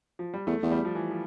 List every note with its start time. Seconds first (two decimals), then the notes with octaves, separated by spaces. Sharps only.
0.19 F3
0.34 G3
0.47 E2 A3
0.63 E2 A3
0.71 G3
0.85 F3
0.95 E3
1.11 F3